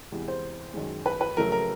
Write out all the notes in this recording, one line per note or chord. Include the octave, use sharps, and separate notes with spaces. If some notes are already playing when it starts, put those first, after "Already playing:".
E2 C3 E3 G#3
C5
F#2 D#3 G#3
B4
B4
F2 C#3 F#3 A3 A#4
A#4